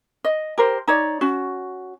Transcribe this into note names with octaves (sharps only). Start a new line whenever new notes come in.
D#5
G4 A#4 C5
D#4 C#5 D5
C#4 F#4